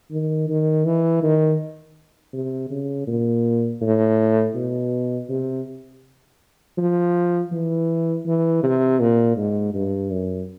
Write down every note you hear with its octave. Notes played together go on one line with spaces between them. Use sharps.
D#3
D#3
E3
D#3
C3
C#3
A#2
A2
B2
C3
F3
E3
E3
C3
A#2
G#2
G2
F#2